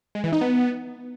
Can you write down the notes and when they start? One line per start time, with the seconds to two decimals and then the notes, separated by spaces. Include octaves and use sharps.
0.15 G#3
0.24 E3
0.33 D#4
0.41 B3